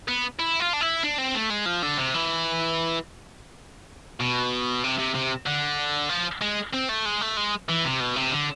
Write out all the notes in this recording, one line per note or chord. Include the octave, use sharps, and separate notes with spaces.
B3
E4
F4
D4
E4
D4
C4
A3
G#3
F3
D3
C3
E3
B2
C3
C3
C3
D3
F3
G#3
C4
A3
G#3
A3
G#3
E3
C3
B2
C3
D3